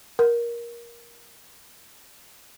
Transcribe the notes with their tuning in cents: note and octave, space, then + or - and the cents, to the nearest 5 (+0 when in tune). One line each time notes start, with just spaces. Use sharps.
A#4 +15